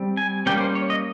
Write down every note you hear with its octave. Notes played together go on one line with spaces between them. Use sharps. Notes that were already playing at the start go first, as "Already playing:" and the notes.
Already playing: G3 C4
G#5
G3 A#3 C#4 G5
C5
C#5
D#5